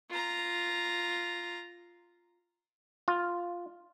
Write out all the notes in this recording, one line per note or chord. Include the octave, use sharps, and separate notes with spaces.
F4 A#5
F4